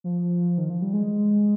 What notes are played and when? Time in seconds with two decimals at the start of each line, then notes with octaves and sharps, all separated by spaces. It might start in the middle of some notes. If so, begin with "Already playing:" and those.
0.04 F3
0.58 D#3
0.70 F3
0.82 G3
0.93 G#3